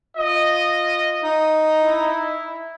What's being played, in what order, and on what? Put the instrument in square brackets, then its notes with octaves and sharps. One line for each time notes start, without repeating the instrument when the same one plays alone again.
[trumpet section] F4 D#5
[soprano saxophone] D#4
[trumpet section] E4